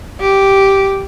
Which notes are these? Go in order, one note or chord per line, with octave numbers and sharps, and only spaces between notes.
G4